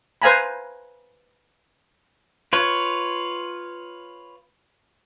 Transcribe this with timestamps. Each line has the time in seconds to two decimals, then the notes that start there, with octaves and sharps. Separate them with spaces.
0.22 B4 C5 F5 G#5 A#5 B5
2.53 F4 B4 C#5